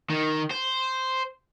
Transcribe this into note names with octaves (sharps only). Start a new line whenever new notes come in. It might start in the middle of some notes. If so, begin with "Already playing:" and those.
D#3
C5